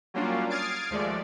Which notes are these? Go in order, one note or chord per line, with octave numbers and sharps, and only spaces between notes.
F#3 G3 A#3 C#4 D4 F4
D#6 F6 G#6 A6 C7 D7
D#2 F3 G#3 A3 D5